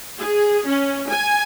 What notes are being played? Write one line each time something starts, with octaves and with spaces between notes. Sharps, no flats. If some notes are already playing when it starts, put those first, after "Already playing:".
G#4
C#4
G#5